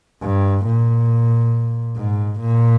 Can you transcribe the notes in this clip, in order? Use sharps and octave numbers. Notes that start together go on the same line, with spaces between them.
G2
A#2
G#2
A#2